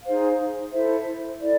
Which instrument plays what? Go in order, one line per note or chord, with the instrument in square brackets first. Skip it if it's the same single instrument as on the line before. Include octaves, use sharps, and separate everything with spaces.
[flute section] D#4 G#4 C5 F5
E4 A4 C5 E5
E4 A4 D5